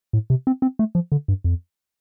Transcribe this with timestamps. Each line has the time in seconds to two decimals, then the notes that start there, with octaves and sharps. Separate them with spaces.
0.13 A2
0.30 C3
0.47 C4
0.62 C4
0.79 A3
0.95 F3
1.12 D3
1.28 G2
1.44 F2